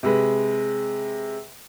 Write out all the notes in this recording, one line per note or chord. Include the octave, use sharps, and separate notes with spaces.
C3 G#3 B4